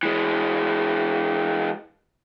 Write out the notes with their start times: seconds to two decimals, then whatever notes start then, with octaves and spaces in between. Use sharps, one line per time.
0.03 E3 G#3